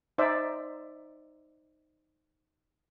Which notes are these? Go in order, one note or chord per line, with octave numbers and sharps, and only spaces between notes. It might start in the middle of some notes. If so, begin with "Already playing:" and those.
D#4 C5 D5 E5